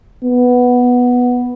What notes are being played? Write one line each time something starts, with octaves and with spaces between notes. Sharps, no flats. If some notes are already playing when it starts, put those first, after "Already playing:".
B3